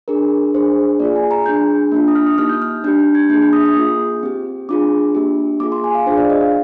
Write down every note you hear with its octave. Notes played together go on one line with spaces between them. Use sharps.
D4 G#4 A#4
D4 G#4 C5
A#3 F4 G#4 D5
G#5
A#5
D4 G#4 G6
A#3 D4 F4
D#6
F6
D#6
A#3 D#4 G4 F6
G6
F6
D4 G4 G6
G6
G#6
A#3 D4 G#4 G6
G6
D#6
D#6
A#3 F4 G#4
C4 G4
D4 F4 G#4 D6
A#3 D4 G4
A#3 F4 G#4 D6
C6
G#5
F5
D4 F4 G#4 C5
D5
D#5
F5